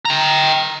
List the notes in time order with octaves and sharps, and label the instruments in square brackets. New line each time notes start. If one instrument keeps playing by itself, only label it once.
[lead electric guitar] G5 A#5